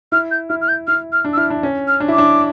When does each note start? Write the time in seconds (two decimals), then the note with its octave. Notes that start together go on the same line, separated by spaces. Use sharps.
0.12 E4 F6
0.31 G6
0.50 E4 F6
0.61 F6
0.69 G6
0.87 E4 F6
1.13 F6
1.25 D4
1.33 E6
1.37 E4 F6
1.50 D4
1.63 C#4
1.88 F6
2.00 D4
2.08 E4
2.13 D6
2.18 D4